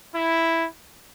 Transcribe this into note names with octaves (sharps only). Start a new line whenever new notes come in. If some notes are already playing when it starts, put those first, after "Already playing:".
E4